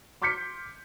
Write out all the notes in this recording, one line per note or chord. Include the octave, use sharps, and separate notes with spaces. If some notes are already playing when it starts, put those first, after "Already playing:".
C6 D6 F6 G6 B6 C#7